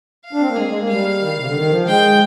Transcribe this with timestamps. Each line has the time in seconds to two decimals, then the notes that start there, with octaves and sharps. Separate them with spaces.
0.25 F5
0.33 D4
0.40 C4
0.49 A#3
0.56 G#3 G#4
0.67 G#3
0.78 A#3
0.89 G3 F5
1.21 D#3
1.37 C3
1.46 D3
1.54 D#3
1.69 F3
1.86 G#3 G5